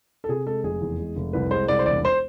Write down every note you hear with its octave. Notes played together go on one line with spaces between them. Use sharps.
A4
C3 G#4
G#3 A4
F1 G#4
E2
G#3
F1
C2 B4
G#3 C5
C2 D5
C5
E1 D5
C5